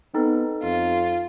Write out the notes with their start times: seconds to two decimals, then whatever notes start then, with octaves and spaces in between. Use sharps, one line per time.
0.14 B3 C4 D#4 A4
0.63 F2 F4